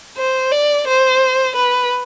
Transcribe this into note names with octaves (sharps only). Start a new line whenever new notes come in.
C5
D5
C5
B4